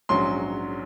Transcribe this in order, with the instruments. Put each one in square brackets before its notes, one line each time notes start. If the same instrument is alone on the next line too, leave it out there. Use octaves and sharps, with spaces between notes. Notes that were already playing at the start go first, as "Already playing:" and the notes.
[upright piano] A#1 G#2 F#3 C#4 C6